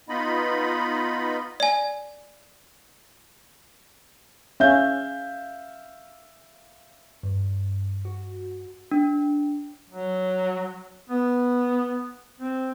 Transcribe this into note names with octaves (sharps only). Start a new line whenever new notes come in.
B3 D#4 F4 D#5 B5
D5 G#5
C#4 E5 F5 G6
G2
F#4
D4
F#3
B3
C4